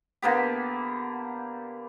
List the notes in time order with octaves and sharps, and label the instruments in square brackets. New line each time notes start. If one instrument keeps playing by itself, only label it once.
[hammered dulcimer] D3 A#3 B3 G4